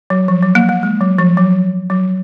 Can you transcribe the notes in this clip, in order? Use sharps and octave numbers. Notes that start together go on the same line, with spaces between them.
F#3
F3
F#3
A#3
A#3
G#3
F#3
F3
F#3
F#3